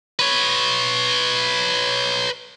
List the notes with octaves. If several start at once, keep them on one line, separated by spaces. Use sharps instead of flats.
B4 C#5